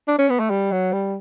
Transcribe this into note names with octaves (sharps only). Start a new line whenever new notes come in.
D4
C#4
B3
A3
G3
F#3
G3